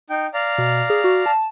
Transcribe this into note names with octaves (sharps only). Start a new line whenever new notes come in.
D#4 G5
D5 F5 A#5
B2
G#4
F#4
A5